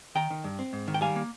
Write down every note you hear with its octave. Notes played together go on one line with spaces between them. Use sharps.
D#3 G5 A#5
D#3
G2
C4
G#2
D#3
G5
G3 F5 G#5
A#3